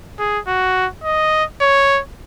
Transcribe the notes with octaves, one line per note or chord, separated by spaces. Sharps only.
G#4
F#4
D#5
C#5